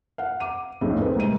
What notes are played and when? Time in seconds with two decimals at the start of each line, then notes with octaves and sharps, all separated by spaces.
0.18 F5 F#5
0.40 D6 D#7
0.81 B1 F2 A2 C#3
1.01 C4 B4
1.16 C2 G#2 D#7